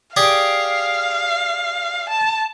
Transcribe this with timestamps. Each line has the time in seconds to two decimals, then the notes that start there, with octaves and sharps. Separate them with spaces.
0.17 G4 G#4 D5 F5
2.09 A5